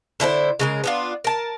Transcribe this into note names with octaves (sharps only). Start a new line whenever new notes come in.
D3 E4 A4 C5
C#3 G#3 A#4
B3 D4 F4
A#4 A5